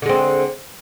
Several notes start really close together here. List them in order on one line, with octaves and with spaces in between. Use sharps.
D3 G#3 C4